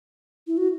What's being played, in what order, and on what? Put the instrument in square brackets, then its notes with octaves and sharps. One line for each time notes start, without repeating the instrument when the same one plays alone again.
[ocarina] E4
F#4